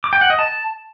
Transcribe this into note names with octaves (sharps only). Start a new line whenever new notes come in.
D6
G5
F#5
D#5
A5